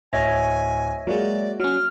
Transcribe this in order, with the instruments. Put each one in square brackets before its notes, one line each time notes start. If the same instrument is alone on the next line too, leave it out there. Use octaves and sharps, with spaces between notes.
[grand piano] D1 [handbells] C#5 D#5 E5 [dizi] G#5
[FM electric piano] F#3 G#3 [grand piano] A#3 F#4 [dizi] D5
[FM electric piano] F#3 C#4 [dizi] F6